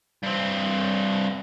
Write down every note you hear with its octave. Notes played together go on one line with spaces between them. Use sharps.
G2 C4